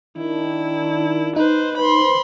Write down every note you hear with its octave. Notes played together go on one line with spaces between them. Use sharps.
D#3 D4 E4
D#4 B4 C5
B4 C5 B5 C6